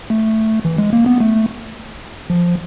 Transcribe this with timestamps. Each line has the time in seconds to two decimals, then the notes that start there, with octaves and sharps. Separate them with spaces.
0.10 A3
0.65 E3
0.78 G#3
0.93 A#3
1.06 B3
1.20 A3
2.30 F3